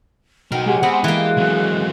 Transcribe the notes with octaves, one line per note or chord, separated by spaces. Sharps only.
F#3 D#4 A#4 F#5 G5
G#3 G4 F#5 G#5
B3 C4
E3 A#3 G4 G#4 F#6
F#3 C4